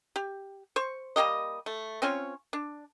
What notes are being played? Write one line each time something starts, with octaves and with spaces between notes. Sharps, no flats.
G4
C5 C#6
G3 A#3 G4 D#5
A3
C4 C#4 F4 C#5
D4